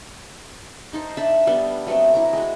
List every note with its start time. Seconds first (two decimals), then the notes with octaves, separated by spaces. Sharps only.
0.93 D#4 A4 C5
1.17 D4 E5 A5 B5
1.47 G3 B3 D4 A4
1.87 F#3 A3 B3 C4
2.14 E4 A#5 D6
2.33 G#3 F#4